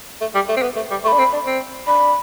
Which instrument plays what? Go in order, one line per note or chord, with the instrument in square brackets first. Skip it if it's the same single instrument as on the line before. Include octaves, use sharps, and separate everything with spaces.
[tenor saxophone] A3
G3
A3
C4
B3
A3
G3
[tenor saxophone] A3 [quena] C#6
[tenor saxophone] D4 [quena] B5
[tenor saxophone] C4
D4
C4
[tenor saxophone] D4 [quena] B5